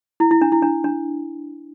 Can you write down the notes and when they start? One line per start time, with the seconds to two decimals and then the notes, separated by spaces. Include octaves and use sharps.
0.20 E4
0.31 E4
0.41 D4
0.52 E4
0.62 D4
0.84 D4